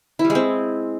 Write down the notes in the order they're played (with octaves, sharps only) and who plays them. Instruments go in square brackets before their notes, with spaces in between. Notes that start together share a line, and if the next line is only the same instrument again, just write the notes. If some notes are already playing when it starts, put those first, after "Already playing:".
[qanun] E4
G3
G#3
C4